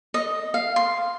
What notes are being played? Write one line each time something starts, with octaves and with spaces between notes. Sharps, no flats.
D#5
F5
C6